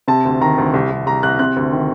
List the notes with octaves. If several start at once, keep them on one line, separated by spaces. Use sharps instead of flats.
C3 A5
D2
D#3 A#5
D2
C2
C2
C2 A#5
C2 F#6
C3 F#6
D2
D#3